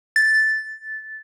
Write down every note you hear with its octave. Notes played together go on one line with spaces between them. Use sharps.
A6